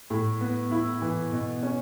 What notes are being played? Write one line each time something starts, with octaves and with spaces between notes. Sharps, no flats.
A2
B3
E4
E3
B2
C#4